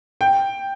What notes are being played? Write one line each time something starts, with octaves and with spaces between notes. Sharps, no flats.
G5